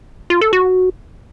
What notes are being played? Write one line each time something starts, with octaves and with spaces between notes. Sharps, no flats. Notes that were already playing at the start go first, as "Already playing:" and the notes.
F4
A4
F#4